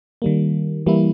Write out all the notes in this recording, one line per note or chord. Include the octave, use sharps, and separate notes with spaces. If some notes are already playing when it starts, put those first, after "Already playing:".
D#3 G3 A#3
E3 G3 A#3 E4